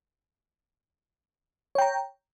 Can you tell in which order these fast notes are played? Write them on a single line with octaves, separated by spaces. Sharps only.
C#5 G5 A#5